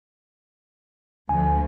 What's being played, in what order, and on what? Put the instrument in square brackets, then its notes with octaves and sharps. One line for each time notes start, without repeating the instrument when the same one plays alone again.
[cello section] D2 F3 [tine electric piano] G#5